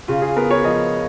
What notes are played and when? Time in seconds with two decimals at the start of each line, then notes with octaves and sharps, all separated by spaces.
0.08 C#3 F4
0.22 G#4
0.36 B3 A#4
0.51 C#5
0.64 F3 D#5